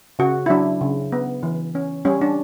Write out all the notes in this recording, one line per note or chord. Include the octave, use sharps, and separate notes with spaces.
C#3 F#4
E4
F#3 D4
C#3
B3
E3
C#4
G3 C#4
D4